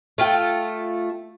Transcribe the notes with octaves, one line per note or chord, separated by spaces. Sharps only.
A3 F4 G5